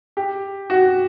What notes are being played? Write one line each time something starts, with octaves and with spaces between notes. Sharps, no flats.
G4
F#4